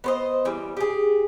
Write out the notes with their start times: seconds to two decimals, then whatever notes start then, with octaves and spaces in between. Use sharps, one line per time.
0.04 B3 C5 D#5
0.45 E3 G3
0.77 G4 G#4